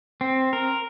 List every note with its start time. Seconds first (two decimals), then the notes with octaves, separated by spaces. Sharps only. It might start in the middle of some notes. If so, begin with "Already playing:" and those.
0.21 C4
0.53 A#4